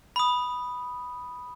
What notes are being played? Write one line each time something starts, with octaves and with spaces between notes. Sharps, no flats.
B5 D#6